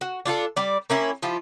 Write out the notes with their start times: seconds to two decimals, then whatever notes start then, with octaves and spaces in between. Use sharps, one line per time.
0.01 F#4
0.25 D4 F4 G#4 A4
0.56 G3 D5
0.90 A#3 C#4 E4 G4
1.22 F3 E4 F4 G4